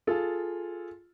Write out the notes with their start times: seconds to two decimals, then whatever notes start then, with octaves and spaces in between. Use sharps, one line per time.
0.07 F4 G#4 A4